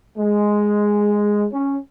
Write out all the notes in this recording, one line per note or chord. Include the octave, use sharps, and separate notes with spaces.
G#3
C#4